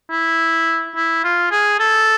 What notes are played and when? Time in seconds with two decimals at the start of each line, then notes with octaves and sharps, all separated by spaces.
0.11 E4
0.96 E4
1.24 F4
1.52 G#4
1.80 A4